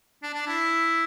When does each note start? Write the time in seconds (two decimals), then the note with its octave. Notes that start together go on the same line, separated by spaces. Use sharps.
0.23 D4
0.34 D4
0.47 E4